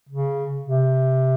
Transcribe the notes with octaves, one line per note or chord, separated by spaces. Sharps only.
C#3
C3